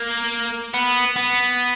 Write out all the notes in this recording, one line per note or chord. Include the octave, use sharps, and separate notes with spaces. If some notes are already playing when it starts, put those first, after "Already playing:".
Already playing: A#3
B3
B3